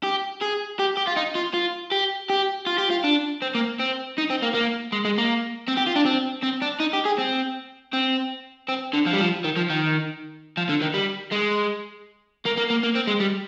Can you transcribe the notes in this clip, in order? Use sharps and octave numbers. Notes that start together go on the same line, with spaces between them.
G4
G#4
G4
G4
F4
D#4
F4
F4
G4
G4
F4
G4
F4
D4
C4
A#3
C4
D#4
C4
A#3
A#3
G#3
G#3
A#3
C4
G4
F4
D4
C4
C4
D4
D#4
G4
G#4
C4
C4
C4
D3
F3
G3
F3
D#3
F3
D#3
F3
D3
D#3
G3
G#3
A#3
A#3
A#3
A#3
C4
G#3
G3